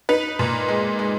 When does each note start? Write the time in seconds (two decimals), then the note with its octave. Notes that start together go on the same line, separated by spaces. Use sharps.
0.09 D#4 B4
0.39 A#2
0.68 G#3
0.99 G#3